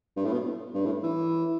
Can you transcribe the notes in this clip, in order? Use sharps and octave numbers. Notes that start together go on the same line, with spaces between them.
G2
A2
B2
G2
A2
E3